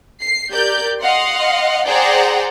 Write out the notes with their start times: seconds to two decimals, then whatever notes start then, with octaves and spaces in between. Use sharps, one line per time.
0.21 C7
0.52 G4 A#4 D5 G6
1.00 D#5 F5 F#5 C6
1.87 G#4 C5 D5 F#5 G5 A#5